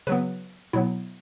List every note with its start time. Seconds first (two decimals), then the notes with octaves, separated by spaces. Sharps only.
0.07 C#3 F#3 B3 B4
0.73 B2 F#3 B3 E4